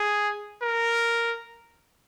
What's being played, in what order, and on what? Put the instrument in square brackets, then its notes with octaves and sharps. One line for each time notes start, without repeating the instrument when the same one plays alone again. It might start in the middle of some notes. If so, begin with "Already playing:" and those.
Already playing: [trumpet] G#4
A#4